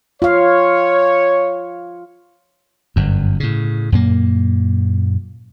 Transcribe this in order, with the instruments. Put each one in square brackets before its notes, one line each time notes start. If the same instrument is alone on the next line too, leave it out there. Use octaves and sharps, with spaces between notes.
[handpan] F4 F5 [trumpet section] C#5
[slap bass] G1 F#2
A2 C#3
F#2 A#2 A#3